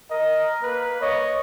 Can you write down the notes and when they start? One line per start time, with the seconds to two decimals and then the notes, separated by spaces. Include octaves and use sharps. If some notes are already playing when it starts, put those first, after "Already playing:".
0.11 A#4 D#5
0.63 A#3 B4
1.02 C#5 D#5